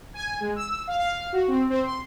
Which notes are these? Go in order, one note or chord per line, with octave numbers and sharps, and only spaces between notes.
G#5
G#3
E6
F5
F5
F#4
C4
C4
C6